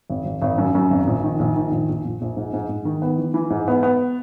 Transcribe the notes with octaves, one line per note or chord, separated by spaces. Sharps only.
G#1
G#1
G#1
F#2
F#2
G#1
A#1
D#3
A#1
D#3
A#1
A#1
A#1
A#1
G#2
G#2
G#2
D#3
B3
E3
E3
G#2
B3
B3